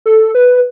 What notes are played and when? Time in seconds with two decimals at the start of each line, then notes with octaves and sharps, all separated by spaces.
0.06 A4
0.35 B4